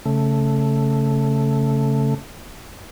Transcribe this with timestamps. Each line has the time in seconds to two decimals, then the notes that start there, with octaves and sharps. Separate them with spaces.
0.06 C#3 A3